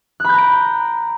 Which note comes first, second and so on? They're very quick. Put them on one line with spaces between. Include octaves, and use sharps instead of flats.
F#6 B5 G6 A#5 D7